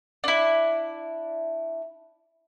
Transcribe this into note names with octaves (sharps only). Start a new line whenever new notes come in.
D4 E4